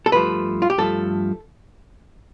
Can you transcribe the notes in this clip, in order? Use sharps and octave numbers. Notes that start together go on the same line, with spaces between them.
A4
G2 F3 A3 B4
F4
G4
G2 F3 A3 A4